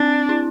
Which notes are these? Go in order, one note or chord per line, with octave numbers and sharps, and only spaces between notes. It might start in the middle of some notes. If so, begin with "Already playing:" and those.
Already playing: C4 D4
E4